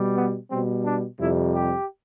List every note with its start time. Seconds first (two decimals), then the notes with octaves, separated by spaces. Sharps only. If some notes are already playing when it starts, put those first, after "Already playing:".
Already playing: B2 G3
0.15 B3
0.50 B2 G3 C4
0.85 D4
1.19 F2 C3 G3 E4
1.54 G4